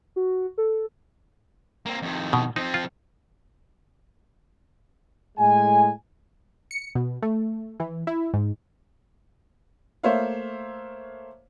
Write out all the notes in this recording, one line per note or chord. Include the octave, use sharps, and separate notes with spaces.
F#4
A4
A#3 C4
F2 D#3
B2
F3 C4 D#4
F4
A2 G#3 G#5
C#7
B2
A3
E3
E4
G#2
A3 A#3 C5 C#5 E5 F5